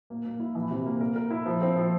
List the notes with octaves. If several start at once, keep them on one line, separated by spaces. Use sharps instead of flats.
A#3
A#3
E4
E3
C3
A#3
A#4
A#4
E4
F3
C4
F3